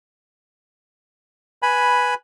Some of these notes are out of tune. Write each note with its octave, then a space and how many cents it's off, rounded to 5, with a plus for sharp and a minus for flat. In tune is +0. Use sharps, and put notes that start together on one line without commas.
B4 -5 G#5 +5 B5 +0